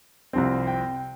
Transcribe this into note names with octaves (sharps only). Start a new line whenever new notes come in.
C2 C3 F3 C4
G5